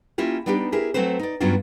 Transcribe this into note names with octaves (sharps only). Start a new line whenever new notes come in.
A#3 C#4 E4 F4 G4
G3 B3 D4 D#4 G4
E4 G4 G#4 A#4
F#3 A3 C4 B4 C5
D#4 D5
G2 F#3 B3 C#4 D4 F4